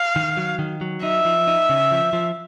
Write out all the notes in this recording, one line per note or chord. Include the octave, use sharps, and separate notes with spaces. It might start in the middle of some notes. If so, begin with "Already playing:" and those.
Already playing: F5
D#3
F#3
D#3
F#3
D#4 E5
F3
D#4
C#3
F3
F3